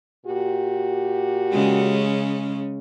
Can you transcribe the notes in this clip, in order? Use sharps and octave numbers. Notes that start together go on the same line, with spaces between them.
A#2 F#4 G4
C#3 G#3 C#4